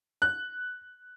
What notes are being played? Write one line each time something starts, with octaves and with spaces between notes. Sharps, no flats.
F#6